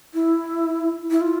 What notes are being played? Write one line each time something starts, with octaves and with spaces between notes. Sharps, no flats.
E4
E4
F4